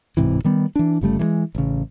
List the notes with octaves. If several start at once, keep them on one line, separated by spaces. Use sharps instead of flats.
D1 G#2 C3 E3
D#3 G3 B3
E3 D4
G1 C#3 G3 A3
E3 G3 G#3
A1 C#3